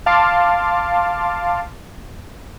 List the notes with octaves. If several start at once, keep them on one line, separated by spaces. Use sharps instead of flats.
F5 A5 C6 D6